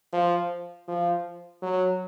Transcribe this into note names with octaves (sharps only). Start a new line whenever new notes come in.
F3
F3
F#3